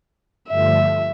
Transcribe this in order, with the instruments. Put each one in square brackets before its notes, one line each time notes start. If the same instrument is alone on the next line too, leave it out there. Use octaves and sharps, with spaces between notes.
[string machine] G2 D3 F3 A3 [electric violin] E5